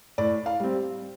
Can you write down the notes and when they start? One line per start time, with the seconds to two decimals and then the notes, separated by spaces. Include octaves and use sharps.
0.18 A2 D5
0.46 F5
0.60 G3 C4